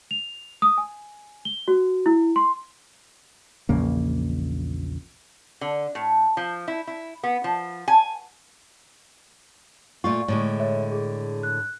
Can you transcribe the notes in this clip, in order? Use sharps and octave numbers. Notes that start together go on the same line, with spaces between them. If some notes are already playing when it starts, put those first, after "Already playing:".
F7
D#6
G#5
G7
F#4
E4
C6
A#1 E2 C#3 A#3
D3
A2
F3
E4
E4
B3
F3
G#5
A#2 A3 F4 D5 C#6
A2 D3 G#3
C#5 E5
G#4
F#6